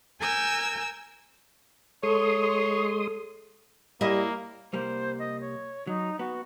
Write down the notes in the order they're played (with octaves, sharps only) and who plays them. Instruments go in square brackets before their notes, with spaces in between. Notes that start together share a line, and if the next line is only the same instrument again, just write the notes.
[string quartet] A#4 G#5 E6 G6
[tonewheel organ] G#3 C6 D#6 [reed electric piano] A4 [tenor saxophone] C#5
[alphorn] G3 [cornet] A#3 [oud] E4 D#5
[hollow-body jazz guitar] C2 G3 A#3 [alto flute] C5
[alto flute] D#5
C#5
[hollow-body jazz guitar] F#3 [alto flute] D#4
[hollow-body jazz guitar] B3 [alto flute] F#4